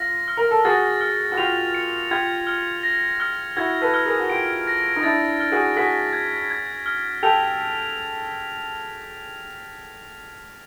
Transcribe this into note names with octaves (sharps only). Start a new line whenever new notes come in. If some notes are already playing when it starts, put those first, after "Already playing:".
Already playing: F4 A#6
F6
A#4
A4
F#4 G#4 A6
F6
F#4
F4 G4 F7
C#7
F4 G4 G#6
F6
A#6
F6
E4 F#4 G#6
A4 B4
F6
G#4 A#4
F#4
F4 G4 D7
A#6
D#4
D4 E4 A6
F6
F#4 G#4
F#4 G#4 B6
G#6
G#6
F6
G4 A4 F7